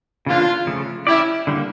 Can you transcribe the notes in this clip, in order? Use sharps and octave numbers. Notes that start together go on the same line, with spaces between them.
C#3 E3 A#3 D4 F4
C#3 F3 A3
C#4 E4 G4 D5
D3 G3 A#3